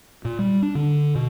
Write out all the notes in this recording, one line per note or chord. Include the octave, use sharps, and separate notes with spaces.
A#2
G3
D4
D3
B2